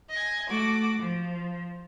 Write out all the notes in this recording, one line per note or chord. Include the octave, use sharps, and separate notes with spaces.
D#5 G#5
A3 F#4 D6
F3